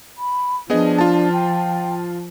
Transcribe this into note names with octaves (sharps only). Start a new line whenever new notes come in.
B5
F3 B3 D4 G#4 D#5
F4 A5
G5